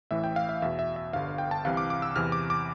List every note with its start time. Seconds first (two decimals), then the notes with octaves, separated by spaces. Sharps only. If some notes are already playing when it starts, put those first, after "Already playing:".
0.11 A1 A2 E3 E5
0.24 G5
0.36 F5
0.49 E5
0.62 E2 B2 E5
0.79 E5
0.96 E5
1.13 G1 G2 D3 F5
1.38 G5
1.51 A5
1.65 C2 C3 E3 F5
1.77 D6
1.90 D6
2.02 E6
2.16 E2 C3 E3 F6
2.32 D6
2.50 D6